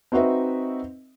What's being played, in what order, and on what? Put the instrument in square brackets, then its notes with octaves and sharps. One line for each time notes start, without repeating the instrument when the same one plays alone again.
[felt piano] C4 D#4 F#4 B4 D#5 E5